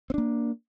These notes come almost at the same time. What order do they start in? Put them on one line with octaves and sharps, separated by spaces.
C4 D4 A#3